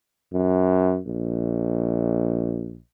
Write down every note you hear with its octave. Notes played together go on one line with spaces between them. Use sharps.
F#2
A#1